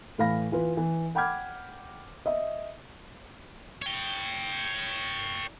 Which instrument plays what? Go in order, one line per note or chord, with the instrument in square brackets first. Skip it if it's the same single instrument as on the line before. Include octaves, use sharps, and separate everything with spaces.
[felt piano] A2 E3 F5 B5 A#6
E3 F4 B4
E3
F#5 G5 B5 D6 F6 G#6
D#5 E5
[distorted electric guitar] C#5 G5